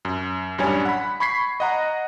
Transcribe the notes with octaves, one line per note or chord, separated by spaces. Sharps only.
F#2
A1 F#2 G3 D4 C#5 G#5
F#5 B5
B5 C#6 G#6 B6 C7
D#5 F#5 A#5